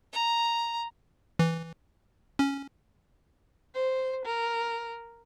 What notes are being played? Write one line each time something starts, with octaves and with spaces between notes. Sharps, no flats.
A#5
E3
C#4
C5
A#4